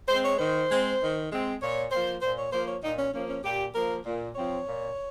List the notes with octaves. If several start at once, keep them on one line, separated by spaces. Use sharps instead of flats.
G#3 C4 C5
C#5
D#3 C5
G#3 C4
D#3
G#3 C4
A#2 C#5
F3 A#3 C5
A#2 C5
C#5
F3 A#3 C5
C#5
A#2 D#4
C#4
F3 A#3 C#4
C#4
A#2 G4
F3 A#3 A#4
A#2
F3 C4 C#5
A#2